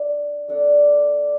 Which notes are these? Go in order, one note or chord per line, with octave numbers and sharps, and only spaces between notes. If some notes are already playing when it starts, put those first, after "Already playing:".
Already playing: D4
A3 D4 A4 D5